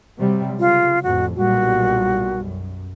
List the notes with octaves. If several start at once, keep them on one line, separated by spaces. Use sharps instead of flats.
C3 F#3 G3
C#3 F4
A1 F2 F#4
B1 A#2 G3 F#4
F#2